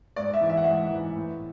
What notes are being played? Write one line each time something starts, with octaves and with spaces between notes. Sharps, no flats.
G#2 D5
E5
E3
E5
F#5
G#2 E5
E3
A2